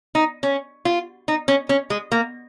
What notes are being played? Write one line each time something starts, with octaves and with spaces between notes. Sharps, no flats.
D#4
C#4
F4
D#4
C#4
C#4
G#3
A#3